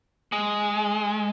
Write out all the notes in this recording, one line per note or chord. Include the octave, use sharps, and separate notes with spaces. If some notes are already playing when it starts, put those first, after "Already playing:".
G#3